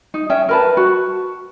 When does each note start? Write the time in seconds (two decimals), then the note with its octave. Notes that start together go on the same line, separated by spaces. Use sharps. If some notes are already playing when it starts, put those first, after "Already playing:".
0.14 D#4
0.30 C#4 E5 G5
0.49 A#4 B4 A5
0.77 F#4